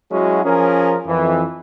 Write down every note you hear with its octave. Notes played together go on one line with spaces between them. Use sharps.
F#3 G#3 C#4 E4 F#4
F3 C#4 G#4 A#4
F2 E3